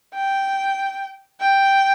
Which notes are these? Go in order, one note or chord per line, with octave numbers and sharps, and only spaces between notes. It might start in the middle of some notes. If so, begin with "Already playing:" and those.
G5
G5